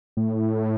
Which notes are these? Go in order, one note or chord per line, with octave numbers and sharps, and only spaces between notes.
A2